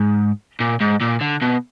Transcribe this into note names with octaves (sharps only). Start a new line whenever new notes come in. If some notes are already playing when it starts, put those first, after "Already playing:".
Already playing: G#2
A#2
G#2
A#2
D3
B2